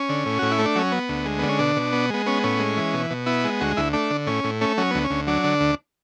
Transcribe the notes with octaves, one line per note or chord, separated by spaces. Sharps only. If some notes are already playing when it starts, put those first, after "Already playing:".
Already playing: C#4
D3
A2
A2 F#4
E4
A3
D4
F#3 C#4
B3
D2
G#3
D3 B3
C#4
B2 D4
B2
B3
G#3 B3
B3 C#4
A2 C#4
G#3
E3
B2
B2
B3 E4
G#3
D2 F#4
D2 E4
A3 D4
D3
A2 C#4
A2
A3 C#4
F#3 C#4
D2 B3
C#4
D2
F#3 D4
D3
D2